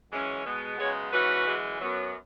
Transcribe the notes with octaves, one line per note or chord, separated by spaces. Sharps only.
F#2 E3 G#3 C#4
B2 G#3 B3
F#2 C#3 G#3 B3 G#4 C#5
G#2 E3 C#4 F#4 B4
F#2 E3 G#3
F#2 F#3 B3